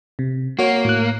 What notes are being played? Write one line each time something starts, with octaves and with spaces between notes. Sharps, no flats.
C3
A#3 F#4 C#5
A2 F#6